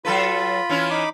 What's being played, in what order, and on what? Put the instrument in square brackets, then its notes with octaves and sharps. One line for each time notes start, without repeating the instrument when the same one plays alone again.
[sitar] F#3 A4 B4 [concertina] F4 B5
[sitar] E3 C#4 E4
[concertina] D#4 B5 D6